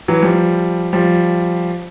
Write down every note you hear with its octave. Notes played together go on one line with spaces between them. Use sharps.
E3 F#3
F3 G3
F3 G3